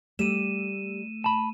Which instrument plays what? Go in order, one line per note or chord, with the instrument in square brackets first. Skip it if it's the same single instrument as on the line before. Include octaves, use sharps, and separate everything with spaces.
[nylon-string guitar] G3 [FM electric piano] A3 [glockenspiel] D#7 E7
[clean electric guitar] A5 B5